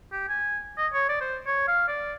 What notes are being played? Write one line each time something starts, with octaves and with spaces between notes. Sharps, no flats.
G4
G#5
D#5
C#5
D5
C5
C#5
F5
D5